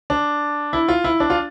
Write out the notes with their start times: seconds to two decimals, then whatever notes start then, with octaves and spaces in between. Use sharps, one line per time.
0.10 D4
0.73 E4
0.88 F4
1.04 E4
1.20 D4
1.30 F4